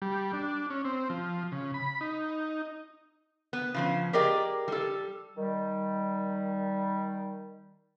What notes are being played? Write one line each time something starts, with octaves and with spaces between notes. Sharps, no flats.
G3
D4
C#4
C4
F3
C#3
B5
D#4
B3
C#3 F3 C#4
G4 G#4 A#4 D5 D#5 G5
G3 A4
D#3 G3